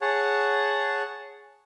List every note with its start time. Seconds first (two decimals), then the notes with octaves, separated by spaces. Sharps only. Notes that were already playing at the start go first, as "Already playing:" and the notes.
0.01 G#4 C#5 F#5 A5